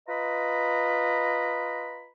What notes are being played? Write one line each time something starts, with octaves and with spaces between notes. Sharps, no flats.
F4 B4 D#5 A#5 B5